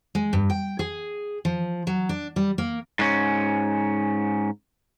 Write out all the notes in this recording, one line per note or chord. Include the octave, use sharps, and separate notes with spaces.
G#3
G2
G5
G#4
F3
F#3
D4
G3
A#3
G#2 C#4